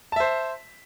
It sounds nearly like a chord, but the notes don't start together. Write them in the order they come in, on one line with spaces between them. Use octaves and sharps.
A5 E5 C5